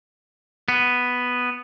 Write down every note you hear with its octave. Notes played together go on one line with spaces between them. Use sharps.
B3